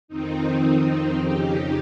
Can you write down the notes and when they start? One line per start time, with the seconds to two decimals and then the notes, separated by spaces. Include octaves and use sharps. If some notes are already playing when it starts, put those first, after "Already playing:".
0.08 F2 D#3 C4 D#4
1.18 F2 C#3 D#4 G4